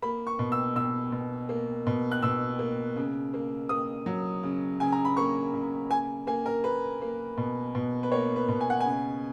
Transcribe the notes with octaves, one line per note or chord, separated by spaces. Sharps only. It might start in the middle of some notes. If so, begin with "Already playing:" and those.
A#3 B5
C#6
B2
E6
B2 E6
B2
A#3
B2
F#6
B2 E6
A#3
C#3
A#3
A#3 D#6
F#3
C#3
C#3 G#5
A#5
B5
A#3 C#6
C#3
A#3 G#5
A#3 G#5
A#4
A#3 B4
A#3
B2
B2
B4
A#3 C#5
B4
B2
G#5
F#5
C#3 G#5